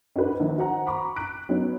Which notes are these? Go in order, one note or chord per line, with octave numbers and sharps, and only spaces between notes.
C#4 D4 F#4 B4 C5
A#1 D#3
F#4 C5 F#5 A#5
A#5 B5 C#6 D6
F#6 B6 D7
F#3 B3 C#4 D#4